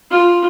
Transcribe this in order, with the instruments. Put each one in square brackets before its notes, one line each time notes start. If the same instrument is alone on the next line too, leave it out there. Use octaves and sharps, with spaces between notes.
[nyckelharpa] F4